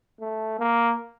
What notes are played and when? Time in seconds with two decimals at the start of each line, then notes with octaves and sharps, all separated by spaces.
0.21 A3
0.59 A#3